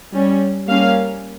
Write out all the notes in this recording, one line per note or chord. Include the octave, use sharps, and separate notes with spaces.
G3 C#4
G3 A#3 C#4 F5